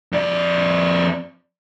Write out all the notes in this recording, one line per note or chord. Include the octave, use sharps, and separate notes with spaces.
F2 D5